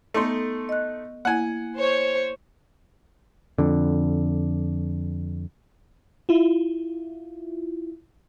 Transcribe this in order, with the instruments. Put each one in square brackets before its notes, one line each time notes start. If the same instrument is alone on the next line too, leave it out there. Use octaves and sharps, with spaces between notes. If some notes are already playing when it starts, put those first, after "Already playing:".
[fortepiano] A3 D#4 C6 [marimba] B3 A4
[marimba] D#5 F#6
[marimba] A#3 E4 [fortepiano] F#5 G#5
[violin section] C5 C#5
[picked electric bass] F2 D3
[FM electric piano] E4 F4